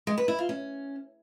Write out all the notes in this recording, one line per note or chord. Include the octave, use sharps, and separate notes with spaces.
G#3
B4
E4
F4
C#4